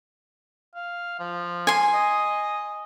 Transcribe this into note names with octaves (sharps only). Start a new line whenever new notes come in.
F5
F3
G#5 C6
D#5